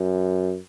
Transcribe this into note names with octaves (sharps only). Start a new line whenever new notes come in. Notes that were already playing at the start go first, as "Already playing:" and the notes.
Already playing: F#2